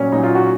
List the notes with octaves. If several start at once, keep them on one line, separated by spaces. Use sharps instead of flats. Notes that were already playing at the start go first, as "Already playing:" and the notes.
Already playing: A#2 F#3 C#4
A#2 F#3 D#4
F4
F#4